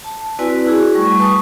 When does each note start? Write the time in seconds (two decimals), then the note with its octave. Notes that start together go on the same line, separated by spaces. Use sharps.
0.04 A5
0.39 C4 E4 F#4 B4 D5 G#5
0.67 E4 F#4 G#4
0.93 G3 A3 C#6
1.19 B4 G#5 A5 C#6 D#6